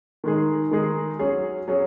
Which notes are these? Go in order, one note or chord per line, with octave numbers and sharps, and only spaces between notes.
D#3 G#3 D#4 G#4
D#3 G#3 D#4 G#4
F#3 C#4 G#4
F#3 C#4 G#4